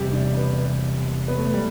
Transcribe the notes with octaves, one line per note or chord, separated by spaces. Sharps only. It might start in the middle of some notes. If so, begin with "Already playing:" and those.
Already playing: E1 E2 C3 G3 G4
D4
B3
B3
A3
G3